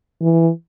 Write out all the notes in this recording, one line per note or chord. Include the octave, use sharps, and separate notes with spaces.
E3